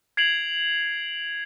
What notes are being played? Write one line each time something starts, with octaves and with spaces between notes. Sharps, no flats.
G#6 C7 D7 F7 F#7